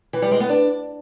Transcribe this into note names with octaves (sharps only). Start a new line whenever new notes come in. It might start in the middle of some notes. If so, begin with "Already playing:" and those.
E3
G3
G#3
B3
D4